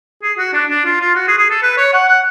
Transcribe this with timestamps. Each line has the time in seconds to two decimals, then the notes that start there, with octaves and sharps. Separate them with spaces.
0.23 G#4
0.38 F#4
0.54 D4
0.70 D4
0.85 F4
1.01 F4
1.15 F#4
1.28 G#4
1.38 G#4
1.50 A4
1.63 B4
1.78 C#5
1.93 F#5
2.08 F#5